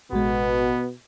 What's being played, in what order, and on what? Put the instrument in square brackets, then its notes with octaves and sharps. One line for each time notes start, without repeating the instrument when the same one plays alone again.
[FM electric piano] A1 G#3 [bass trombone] B2 [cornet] B3 [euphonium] F#4